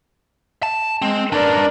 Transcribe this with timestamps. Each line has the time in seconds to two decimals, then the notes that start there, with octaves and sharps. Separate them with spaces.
0.63 A5
1.02 G#3 C4
1.32 D4 A#4 B4 D5